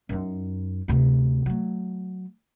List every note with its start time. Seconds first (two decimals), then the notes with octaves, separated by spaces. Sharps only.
0.09 F#2 D#4
0.88 D2 C3
1.46 F#3 A3